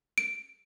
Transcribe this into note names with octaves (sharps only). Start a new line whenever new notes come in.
D7